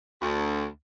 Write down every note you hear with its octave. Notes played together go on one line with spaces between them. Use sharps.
D2